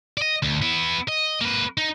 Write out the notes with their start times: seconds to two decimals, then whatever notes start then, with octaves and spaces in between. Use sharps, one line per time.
0.17 D5 D#5
0.42 D2
0.62 B3 E4
1.08 D#5
1.41 A#3 B4
1.78 D#4